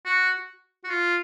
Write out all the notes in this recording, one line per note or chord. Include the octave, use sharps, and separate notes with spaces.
F#4
F#4
F4